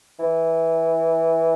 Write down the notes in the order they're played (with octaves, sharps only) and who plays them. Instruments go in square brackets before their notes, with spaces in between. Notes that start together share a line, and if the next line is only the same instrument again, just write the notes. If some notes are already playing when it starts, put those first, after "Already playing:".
[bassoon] E3